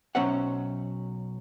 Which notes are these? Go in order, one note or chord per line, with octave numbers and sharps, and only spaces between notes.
B1 F#3 C#4 C5 E5 F#5